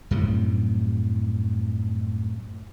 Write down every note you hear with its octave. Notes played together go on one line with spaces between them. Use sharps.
F#2 A2 C3 G3